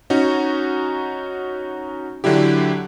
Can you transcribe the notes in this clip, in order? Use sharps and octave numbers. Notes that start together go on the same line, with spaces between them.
C#4 D#4 F#4
D3 F#3 D4 E4 G4